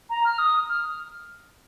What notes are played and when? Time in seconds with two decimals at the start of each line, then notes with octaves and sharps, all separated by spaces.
0.10 A#5
0.25 F6
0.39 D#6
0.69 F6